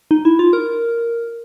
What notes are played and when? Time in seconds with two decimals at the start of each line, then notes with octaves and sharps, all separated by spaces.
0.11 D#4
0.25 E4
0.39 F4
0.53 A#4